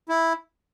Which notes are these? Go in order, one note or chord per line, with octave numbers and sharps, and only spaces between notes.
E4